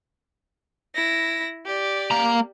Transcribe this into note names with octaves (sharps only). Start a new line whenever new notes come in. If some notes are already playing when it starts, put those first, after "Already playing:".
E4 A#6
G4 D5
A#3 A#5